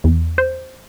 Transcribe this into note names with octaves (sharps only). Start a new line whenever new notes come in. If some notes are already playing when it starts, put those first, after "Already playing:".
E2
C5